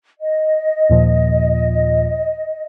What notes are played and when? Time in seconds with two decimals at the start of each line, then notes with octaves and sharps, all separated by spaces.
0.20 D#5
0.90 D#2 A#2 F3